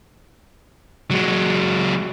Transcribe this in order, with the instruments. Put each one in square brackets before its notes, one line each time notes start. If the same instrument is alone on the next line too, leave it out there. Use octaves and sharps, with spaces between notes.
[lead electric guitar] F#3 G#3